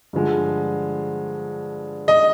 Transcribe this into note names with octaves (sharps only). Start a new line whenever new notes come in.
G2 D3 F3 G#3
D#5